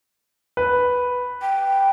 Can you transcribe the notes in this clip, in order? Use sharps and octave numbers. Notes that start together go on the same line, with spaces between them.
B4
G5